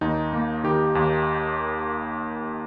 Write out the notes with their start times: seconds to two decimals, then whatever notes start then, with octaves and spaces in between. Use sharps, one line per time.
0.01 D#2 D#4
0.33 A#3
0.64 D#3 G4
0.95 D#2